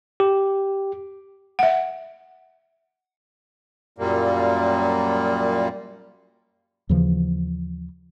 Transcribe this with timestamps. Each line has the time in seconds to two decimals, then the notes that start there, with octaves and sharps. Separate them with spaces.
0.20 G4
1.59 E5 F#5
3.98 F#2 A#2 G3 A#3
6.89 D#2 C#3 E3 F3